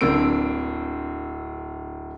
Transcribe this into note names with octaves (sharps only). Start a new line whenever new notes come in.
D1 D3 A#3 C4 E6 D7